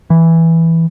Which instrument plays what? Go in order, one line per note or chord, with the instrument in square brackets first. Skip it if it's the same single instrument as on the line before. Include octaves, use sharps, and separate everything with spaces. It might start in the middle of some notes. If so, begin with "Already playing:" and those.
[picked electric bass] E3